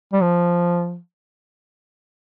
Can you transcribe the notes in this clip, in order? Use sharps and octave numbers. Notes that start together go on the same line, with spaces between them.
G3
F3